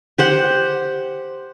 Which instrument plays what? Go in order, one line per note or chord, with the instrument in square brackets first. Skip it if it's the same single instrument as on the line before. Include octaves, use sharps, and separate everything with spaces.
[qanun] G4 C5 F#5